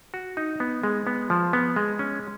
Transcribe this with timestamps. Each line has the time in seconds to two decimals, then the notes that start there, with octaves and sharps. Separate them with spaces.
0.14 F#4
0.37 D#4
0.60 B3
0.84 G#3
1.07 B3
1.30 F3
1.53 B3
1.76 G#3
1.99 C#4